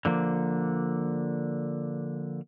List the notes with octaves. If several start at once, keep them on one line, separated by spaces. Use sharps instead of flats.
D3 F3 A#3